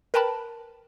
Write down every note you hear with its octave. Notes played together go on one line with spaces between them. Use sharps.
A#4 B4 G5 A5 B5